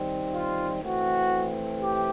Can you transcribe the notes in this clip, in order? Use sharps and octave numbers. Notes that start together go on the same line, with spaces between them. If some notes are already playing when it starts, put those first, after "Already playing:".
Already playing: D#3 G3 C4
F4
E3 A3 C4 F#4
G4